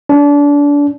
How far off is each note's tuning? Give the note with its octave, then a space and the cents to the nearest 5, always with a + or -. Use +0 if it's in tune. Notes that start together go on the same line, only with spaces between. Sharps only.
D4 -30